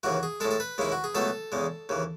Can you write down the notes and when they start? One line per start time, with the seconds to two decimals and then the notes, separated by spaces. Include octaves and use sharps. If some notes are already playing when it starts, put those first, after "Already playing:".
0.03 D#2 C#3 E3 F#4
0.23 G#4
0.40 G#3 A4
0.45 A2
0.51 A4
0.60 B4
0.78 D#2 C#3 G#3 E4
0.92 F#4
1.04 G#4
1.15 C#2 B2 F#3 A3 A4
1.52 E2 C#3 G#3
1.89 D#2 C#3 E3